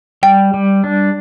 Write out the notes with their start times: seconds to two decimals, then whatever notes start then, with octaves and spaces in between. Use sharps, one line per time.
0.23 G3 G5
0.54 G3
0.84 D4